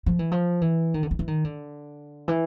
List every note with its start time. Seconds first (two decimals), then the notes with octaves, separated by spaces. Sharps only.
0.06 F3
0.19 E3
0.32 F3
0.61 E3
0.94 D#3
1.03 D3
1.11 D#3
1.19 E3
1.28 D#3
1.45 D3
2.28 E3